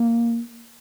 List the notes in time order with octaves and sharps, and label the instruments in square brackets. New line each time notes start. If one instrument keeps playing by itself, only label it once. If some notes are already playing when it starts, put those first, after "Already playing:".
Already playing: [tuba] A#3